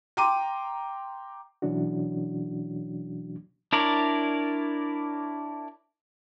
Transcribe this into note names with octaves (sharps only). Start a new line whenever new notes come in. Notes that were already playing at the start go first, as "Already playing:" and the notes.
G5 A#5 C6 D6 D#7
B2 E3 F#3 C#4 D4 F#4
D4 E4 A#4 C#5 D5